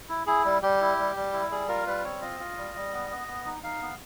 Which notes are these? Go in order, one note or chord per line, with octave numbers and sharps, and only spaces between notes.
E4
E4 G#4
G3
G3 G4
E4
G3
G3
E4
G3 G#4
F4 A#4
G3 B4
C4 C#5
F4 D#5
F4
G3
G3
B3
B3
B3
D#4
D#4 F5
B3